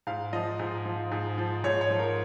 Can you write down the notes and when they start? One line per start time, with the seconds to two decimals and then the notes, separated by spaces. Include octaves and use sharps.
0.07 G#2 F5
0.33 F3 D#5
0.59 G#2
0.86 F3
1.12 G#2
1.38 F3
1.64 G#2 C#5
1.81 C#5
1.90 F3
1.99 A#4